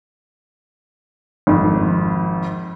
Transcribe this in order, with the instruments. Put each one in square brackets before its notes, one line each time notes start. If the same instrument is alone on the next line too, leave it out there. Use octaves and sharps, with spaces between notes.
[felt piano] G#1 F2